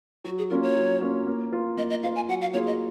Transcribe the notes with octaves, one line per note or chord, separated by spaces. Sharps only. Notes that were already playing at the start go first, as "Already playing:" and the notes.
F#3 F#4
G#4
A#3 C#4 F4 A#4
C#5
F#3
A#3 C#4 F4
A#3
F4 A#4
A#3 D#5
D#5
F4 A#4 F5
G#5
F#3 F#5
F5
A#3 F4 G#4 C#5
D#5